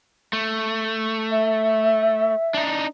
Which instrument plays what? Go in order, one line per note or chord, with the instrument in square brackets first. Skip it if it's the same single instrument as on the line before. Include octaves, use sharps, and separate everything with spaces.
[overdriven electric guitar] A3
[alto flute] E5
[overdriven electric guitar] D4 D#4